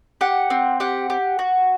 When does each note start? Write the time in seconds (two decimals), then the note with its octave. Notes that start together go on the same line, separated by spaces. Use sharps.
0.21 G4 F#5
0.50 C4
0.80 G4 F#5
1.10 G4
1.39 F#4